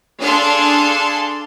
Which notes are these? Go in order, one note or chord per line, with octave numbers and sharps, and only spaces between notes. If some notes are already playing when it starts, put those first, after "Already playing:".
D4 G#4 A4 F5 A5 C6